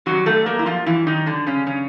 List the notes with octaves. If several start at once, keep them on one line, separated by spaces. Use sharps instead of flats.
F#2 D#3 F#3 G3 F#4
A3 A4
A#3 A#4
E4
F3 F4
E3 E4
D#3 D#4
D3 D4
C#3 C#4
C#3 C#4